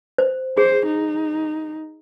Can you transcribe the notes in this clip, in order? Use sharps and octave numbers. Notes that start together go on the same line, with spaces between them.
C5
G#4 C5
D#4